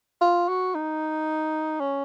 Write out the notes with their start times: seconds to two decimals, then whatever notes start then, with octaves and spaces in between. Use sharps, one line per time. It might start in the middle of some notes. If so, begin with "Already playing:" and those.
0.21 F4
0.48 F#4
0.75 D#4
1.80 C#4